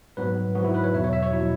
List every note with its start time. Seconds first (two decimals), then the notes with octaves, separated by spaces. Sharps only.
0.17 G#2 F#3 B3 B4
0.55 G#2 F#3 B3 F#4
0.65 E4
0.74 B4
0.84 C#5
0.94 E2 B2 F#3 E5
1.04 C#5
1.13 E5
1.22 C#5
1.33 B2 F#3 E4